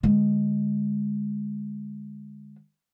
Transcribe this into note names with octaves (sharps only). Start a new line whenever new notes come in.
D3 G#3